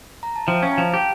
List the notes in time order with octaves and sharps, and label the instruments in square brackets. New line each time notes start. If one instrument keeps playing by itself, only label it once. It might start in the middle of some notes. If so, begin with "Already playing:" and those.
[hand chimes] A#5
A5
[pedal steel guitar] F3 [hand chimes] E5 G5
[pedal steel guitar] C#4 [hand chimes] F5 A5
[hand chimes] A#5
[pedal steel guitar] F3 [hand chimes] F5 A5
[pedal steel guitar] G4